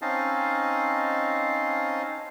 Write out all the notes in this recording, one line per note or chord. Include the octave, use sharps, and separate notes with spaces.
C4 C#4 D#4 D#5 F5 A5